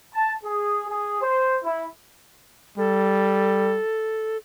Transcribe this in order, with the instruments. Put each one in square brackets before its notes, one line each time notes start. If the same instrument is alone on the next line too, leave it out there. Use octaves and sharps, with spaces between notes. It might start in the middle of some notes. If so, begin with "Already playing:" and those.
[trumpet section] A5
G#4
G#4
C5
E4
[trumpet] G3 [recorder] A4